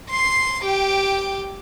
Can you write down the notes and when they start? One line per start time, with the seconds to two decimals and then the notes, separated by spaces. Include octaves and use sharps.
0.10 C6 C7
0.64 G4 G5